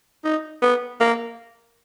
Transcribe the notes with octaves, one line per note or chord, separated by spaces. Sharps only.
D#4
B3
A#3